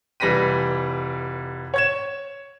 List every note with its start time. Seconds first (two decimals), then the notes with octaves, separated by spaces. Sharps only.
0.20 F1 E3 G3 A#6 B6 D#7
1.74 C#5 G#6 E7